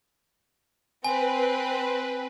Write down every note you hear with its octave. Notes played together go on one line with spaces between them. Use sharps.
C4 B4 G#5